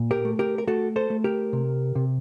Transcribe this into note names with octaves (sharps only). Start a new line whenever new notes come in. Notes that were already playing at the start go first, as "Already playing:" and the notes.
Already playing: A#2
G4 A#4
A3
G4 A#4
A#4
A3 F#4 A4
A4 C5
A3
G4 A#4
C3
C3